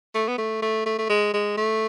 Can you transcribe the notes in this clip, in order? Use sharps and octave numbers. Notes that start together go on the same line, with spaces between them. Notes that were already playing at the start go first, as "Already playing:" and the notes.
A3
B3
A3
A3
A3
A3
G#3
G#3
A3